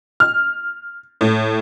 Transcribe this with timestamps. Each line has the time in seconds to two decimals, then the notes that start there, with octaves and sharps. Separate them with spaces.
0.20 F6
1.21 A2